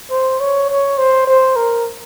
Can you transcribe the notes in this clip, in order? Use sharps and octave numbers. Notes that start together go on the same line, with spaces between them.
C5
C#5
C#5
C5
C5
A#4